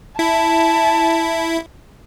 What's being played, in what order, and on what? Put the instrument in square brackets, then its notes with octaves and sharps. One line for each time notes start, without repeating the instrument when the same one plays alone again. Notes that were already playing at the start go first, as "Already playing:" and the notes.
[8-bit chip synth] E4 [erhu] A5